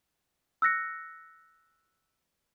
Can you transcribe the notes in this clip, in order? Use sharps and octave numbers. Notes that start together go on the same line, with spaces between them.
E6 F#6 A#6 C#7